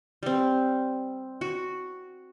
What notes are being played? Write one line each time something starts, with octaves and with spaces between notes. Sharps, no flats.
G3 C4
F#4